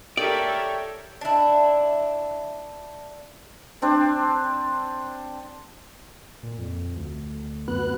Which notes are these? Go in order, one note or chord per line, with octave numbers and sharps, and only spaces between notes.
G4 A4 A#4 C#5 D5 E5 G5
D4 E4
C4 D4 C5
A#2
F2
D2
F#2 B3 F#6